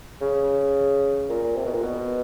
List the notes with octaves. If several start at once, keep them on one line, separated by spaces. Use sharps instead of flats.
C#3
A#2
C3
B2
A#2
B2